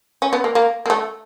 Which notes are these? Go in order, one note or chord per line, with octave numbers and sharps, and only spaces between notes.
C#4
B3
A#3
A#3
A#3
A3